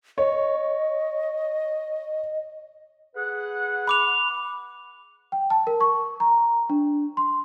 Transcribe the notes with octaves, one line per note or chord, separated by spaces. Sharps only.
C#5 D#5
G#4 B4 F#5
B5 D6 F7
G5
A5
A#4
C#6
A#5
D4
C6